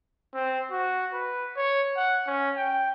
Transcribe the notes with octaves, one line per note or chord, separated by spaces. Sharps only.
C4
F#4
B4
C#5
F#5
C#4
G5